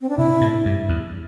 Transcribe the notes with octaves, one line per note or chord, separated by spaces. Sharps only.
C4
D4
C3 E4
A2
G2
E2